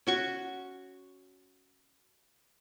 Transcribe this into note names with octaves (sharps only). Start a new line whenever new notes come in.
C#4 F#4 C#6